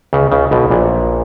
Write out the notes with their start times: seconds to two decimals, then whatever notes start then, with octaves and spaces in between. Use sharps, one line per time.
0.13 C#2 C#3
0.32 C#2 C#3
0.51 B1 B2
0.70 A#1 A#2